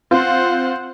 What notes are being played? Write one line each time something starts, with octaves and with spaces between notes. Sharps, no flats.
C4 F4 C5 F#5